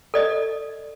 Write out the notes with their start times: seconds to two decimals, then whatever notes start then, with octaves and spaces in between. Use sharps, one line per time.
0.14 A4 D5 D#5